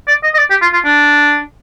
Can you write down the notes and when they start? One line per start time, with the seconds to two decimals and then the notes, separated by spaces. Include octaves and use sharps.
0.08 D5
0.24 D#5
0.34 D#5
0.38 D5
0.50 G4
0.62 F4
0.73 F4
0.85 D4